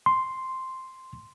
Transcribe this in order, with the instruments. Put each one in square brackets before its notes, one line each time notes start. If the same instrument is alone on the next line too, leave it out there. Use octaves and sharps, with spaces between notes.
[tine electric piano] C6